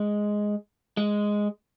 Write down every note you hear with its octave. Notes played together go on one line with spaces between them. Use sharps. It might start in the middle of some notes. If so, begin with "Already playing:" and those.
Already playing: G#3
G#3